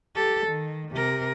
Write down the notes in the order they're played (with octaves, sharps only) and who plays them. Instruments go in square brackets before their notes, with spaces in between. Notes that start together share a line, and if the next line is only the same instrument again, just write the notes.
[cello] G4 A4
D#3
C3 A#4